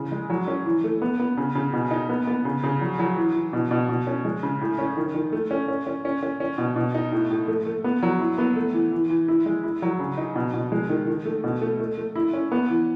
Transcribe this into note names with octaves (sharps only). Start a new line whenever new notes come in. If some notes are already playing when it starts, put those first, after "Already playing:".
Already playing: C#3 E3
G#3
F#3
C#4
E3
A3
B3
B3
C#3
C#3
B2
D#4
B3
B3
C#3
C#3
F#3
F#3
E3
E3
B2
B2
B2
C#4
G#3
C#3
A2
C#4
D#3
D#3
A3
C#4
C#4
C#4
C#4
C#4
C#4
B2
B2
D#4
A2
A2
A3
A3
B3
F#3
E4
B3
A3
E3
E3
E3
E4
G#3
E4
F#3
C#3
D#4
B2
B2
G#3
D#3
D#3
A3
B2
A3
A3
A3
E4
C#4
B3
E3